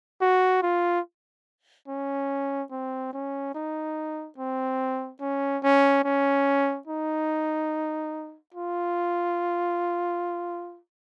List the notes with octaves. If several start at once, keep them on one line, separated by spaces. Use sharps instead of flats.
F#4
F4
C#4
C4
C#4
D#4
C4
C#4
C#4
C#4
D#4
F4